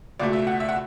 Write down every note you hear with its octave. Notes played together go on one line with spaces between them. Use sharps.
C#2 B2 A3 D5
E5
F#5
E5
F#5